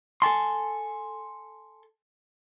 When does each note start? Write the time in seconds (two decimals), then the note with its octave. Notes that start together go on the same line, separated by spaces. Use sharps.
0.22 A4 G#5 A5 C6